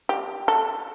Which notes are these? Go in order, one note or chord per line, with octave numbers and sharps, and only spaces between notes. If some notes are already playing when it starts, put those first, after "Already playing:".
G4
A4